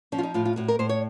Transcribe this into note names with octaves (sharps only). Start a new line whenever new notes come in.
F3 C#4
F4
D#4
A2 F4
F4
A2 F#4
A#4
A2 C5
C#5